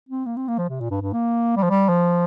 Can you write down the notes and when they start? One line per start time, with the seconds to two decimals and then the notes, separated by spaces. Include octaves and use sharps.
0.09 C4
0.26 A#3
0.37 C4
0.48 A#3
0.58 F3
0.69 C3
0.80 A#2
0.91 G2
1.02 G2
1.13 A#3
1.57 G3
1.63 F3
1.70 G3
1.89 F3